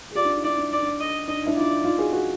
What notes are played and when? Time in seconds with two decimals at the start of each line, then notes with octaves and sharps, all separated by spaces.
0.11 G#4
0.15 F4 G4 D5
0.25 D4
0.34 D#4
0.44 D4 E4 D5
0.58 D4
0.70 D#4 D5
0.82 D4
1.00 D#5
1.28 D4 D#5
1.38 D#4
1.47 D4 E4
1.56 D#4 F4 D5
1.84 D#4 F4
1.98 F#4 G#4
2.13 F#4 G#4